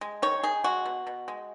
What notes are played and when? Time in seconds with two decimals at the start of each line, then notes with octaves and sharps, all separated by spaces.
0.01 G#3
0.22 D#3 C#5
0.43 D#3 G#4
0.64 G#3 F#4
0.85 B2
1.07 B2
1.28 G#3